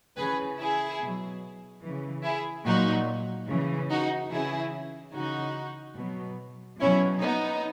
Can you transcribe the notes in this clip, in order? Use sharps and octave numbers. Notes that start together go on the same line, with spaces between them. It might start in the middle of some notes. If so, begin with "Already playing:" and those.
C#3 E3 G#4 B4
E4 G#4
B2 F#3
C#3 E3
E4 G#4
A#2 F#3 D#4 F#4
C#3 E3
D#4 F#4
C#3 E3 E4 G#4
C#3 E3 D#4 F#4
B2 F#3
B2 F#3 C#4 E4
B3 D#4